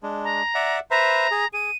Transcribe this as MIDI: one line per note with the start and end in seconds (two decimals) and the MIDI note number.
0.03 0.42 56
0.03 0.42 62
0.24 0.77 82
0.55 0.80 74
0.55 0.80 76
0.55 0.80 78
0.91 1.27 71
0.91 1.27 72
0.91 1.27 76
0.91 1.48 82
1.31 1.45 68
1.53 1.71 68
1.53 1.77 99